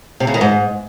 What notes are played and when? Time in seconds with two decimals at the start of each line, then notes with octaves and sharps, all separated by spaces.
0.20 C3
0.27 C#3
0.34 D#3
0.41 G#2